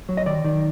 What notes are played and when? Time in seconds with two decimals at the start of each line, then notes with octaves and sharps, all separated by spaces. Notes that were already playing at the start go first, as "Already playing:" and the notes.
0.09 F#3
0.17 D#5
0.26 D#3 D5
0.45 D#3